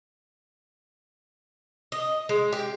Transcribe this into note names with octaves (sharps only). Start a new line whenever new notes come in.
D#5
G#3
G4